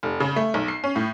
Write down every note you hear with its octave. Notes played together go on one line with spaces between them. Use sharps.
F1
C#3
A3
B1
C7
C#4
A2